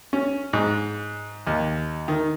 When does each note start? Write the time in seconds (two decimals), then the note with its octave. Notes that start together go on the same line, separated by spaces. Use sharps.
0.13 C#4
0.53 G#2
1.47 D#2
2.08 D#3